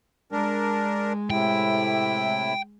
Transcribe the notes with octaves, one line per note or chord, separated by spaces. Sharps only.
G#3 D4 A#4
A2 C3 E4 G5